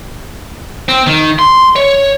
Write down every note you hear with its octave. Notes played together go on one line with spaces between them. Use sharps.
C4
D#3
C6
C#5